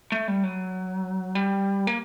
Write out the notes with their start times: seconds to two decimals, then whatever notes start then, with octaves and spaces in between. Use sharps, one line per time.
0.12 A3
0.28 G3
0.44 F#3
1.35 G3
1.87 A#3